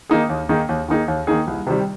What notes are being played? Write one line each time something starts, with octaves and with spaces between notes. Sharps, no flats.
D#3 A#3 D#4 G#4
D#2
D#3 A#3 D#4 G#4
D#2
D#3 A#3 D#4 G#4
D#2
D#3 A#3 D#4 G#4
C2
C3 D#3 G3